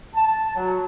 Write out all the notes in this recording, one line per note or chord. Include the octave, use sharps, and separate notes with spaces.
A5
F#3